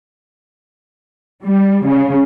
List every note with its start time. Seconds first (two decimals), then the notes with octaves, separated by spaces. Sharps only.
1.44 G3
1.86 C#3